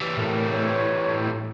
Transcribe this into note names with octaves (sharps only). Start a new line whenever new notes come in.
E3 G3
A2 A#4
C#5